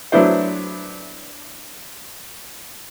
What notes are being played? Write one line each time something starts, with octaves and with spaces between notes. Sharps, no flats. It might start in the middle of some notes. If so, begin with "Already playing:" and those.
F#3 A3 B3 D4 E4 C5